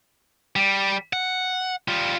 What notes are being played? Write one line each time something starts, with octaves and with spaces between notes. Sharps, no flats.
G3
F#5
G3 F4